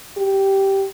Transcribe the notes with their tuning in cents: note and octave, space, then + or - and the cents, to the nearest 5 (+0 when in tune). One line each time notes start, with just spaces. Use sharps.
G4 -10